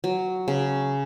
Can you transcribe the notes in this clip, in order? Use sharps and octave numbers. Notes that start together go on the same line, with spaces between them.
F#3
C#3